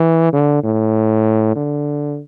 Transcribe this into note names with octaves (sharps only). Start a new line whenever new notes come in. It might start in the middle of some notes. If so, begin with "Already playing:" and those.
Already playing: E3
D3
A2
D3